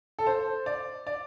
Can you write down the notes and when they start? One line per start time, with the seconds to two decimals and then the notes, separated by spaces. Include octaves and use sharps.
0.19 A4
0.27 C5
0.66 D5
1.07 D5